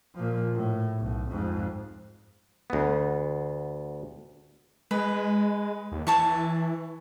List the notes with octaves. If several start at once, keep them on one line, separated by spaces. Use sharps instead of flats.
A#2 F3
A2
B1
F2 G#2
D2 B3
G#3 B4
D#2
E3 C#5 A5 C#6